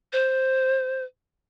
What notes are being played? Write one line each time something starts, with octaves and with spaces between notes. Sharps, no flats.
C5